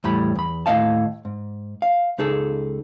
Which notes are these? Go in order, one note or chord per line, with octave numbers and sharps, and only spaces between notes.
E2 A2 G3 B5
E2 B5
D#2 A2 A#3 D#5 F5 A5
G#2
F5
C#2 D#4 G#4 A4